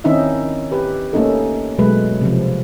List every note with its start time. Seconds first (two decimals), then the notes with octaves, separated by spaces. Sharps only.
0.04 D#3 C4 C#4 D#4 E4 E5
0.72 G4 B4
1.13 A3 A#3 C#4 D#4 A4
1.78 B2 F#3 G#3 A3 B4
2.21 C3 F3